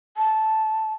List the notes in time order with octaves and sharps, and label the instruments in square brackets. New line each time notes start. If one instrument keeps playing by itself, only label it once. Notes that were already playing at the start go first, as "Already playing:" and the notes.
[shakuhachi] A5